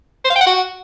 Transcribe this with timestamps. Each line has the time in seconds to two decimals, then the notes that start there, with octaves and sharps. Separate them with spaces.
0.25 C5
0.30 F5
0.36 G5
0.41 F#5
0.47 F#4